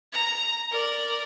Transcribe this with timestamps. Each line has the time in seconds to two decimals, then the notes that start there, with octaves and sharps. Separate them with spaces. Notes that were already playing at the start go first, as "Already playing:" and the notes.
0.13 A#5
0.71 A#4 D5